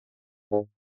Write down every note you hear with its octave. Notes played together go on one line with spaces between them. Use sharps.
G#2